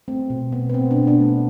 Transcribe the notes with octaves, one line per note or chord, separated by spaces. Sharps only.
A3 C4
B2
B2 B3
B3
B2 C4
B3 D4
B2
B3 D4
A3